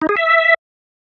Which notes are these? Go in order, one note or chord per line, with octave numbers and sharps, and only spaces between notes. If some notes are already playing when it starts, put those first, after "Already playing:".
D#4
G#4
E5